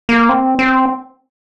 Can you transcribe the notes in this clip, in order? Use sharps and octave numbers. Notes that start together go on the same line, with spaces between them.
A#3
C4
C4